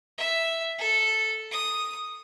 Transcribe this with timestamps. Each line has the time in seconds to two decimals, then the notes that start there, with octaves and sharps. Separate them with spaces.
0.18 E5
0.78 A4
1.51 D#6